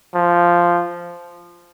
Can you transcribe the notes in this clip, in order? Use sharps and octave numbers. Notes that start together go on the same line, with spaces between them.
F3